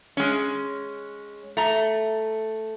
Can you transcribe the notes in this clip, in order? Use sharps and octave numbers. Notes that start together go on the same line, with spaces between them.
G#3 C#4
A3 A#5